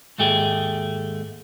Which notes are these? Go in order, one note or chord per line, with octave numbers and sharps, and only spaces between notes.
D#2 G#2 A3 G4 G#4